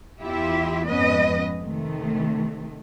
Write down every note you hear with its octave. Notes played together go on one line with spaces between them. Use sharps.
E2 E4 F4 G4 E5
F2 G#2 B3 C#4 B4 D#5
C3 D#3 A3